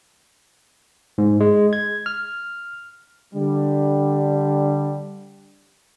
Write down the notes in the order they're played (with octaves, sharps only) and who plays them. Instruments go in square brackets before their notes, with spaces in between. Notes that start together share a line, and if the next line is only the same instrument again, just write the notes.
[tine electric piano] G#2
G#3
G#6
F6
[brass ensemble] D3 G3